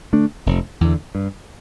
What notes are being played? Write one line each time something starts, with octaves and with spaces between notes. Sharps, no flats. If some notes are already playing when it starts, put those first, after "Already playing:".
D3 A3 D4
F1
E2 D3
G2